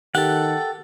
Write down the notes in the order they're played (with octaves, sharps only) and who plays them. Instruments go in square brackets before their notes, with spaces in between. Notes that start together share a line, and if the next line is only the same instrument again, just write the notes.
[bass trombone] D#3 [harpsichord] G4 [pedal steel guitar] A4 F#5 [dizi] G5